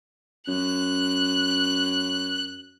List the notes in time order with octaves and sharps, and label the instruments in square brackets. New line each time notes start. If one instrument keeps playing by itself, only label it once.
[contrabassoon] F#2 [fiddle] F#6